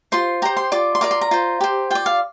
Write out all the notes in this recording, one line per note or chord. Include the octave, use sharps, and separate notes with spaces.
F4 C5 C6
G4 C5 A#5
C6
F4 D5 D6
C6
F4 A#4 D5 D6
C6
A#5
F4 C5
G4 C5
F4 D5 G5
F5